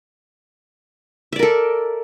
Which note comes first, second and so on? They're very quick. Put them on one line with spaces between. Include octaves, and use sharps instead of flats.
E5 D5 A#4 A4